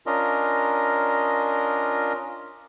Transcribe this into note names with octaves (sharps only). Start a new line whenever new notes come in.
C#4 D4 F4 A#4 D#5